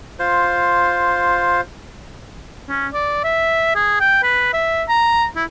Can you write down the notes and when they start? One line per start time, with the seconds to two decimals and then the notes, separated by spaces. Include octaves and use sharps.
0.19 F4 C5
2.69 C#4
2.93 D5
3.24 E5
3.75 G#4
4.00 G5
4.23 B4
4.54 E5
4.89 A#5
5.36 E4